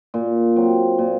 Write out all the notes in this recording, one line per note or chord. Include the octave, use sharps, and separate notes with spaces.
A#2
F#3 C4
A#2